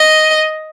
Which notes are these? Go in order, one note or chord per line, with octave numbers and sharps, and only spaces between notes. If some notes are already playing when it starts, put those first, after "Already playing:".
Already playing: D#5